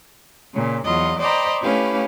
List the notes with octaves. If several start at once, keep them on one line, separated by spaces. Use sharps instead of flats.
A#2 C#3
E2 F#3 F4 D#5
C5 D5 D#5 G5 A#5 B5
A3 C#4 E4 G4 B4 F5